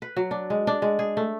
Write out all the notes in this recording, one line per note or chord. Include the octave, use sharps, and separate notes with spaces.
B4
F#3
D4
G#3
D4
G#3
G#4
A3